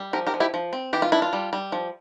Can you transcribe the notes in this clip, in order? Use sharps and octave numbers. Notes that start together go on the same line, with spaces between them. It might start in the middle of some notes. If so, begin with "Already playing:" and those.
Already playing: G3
F3 G4 A#4
G4 A#4
F3
E4 G4
F3
C4
E3 G4
F4
D4 E4
F4
G3
G3
F3